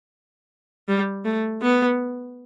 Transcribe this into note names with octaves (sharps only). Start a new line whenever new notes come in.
G3
A3
B3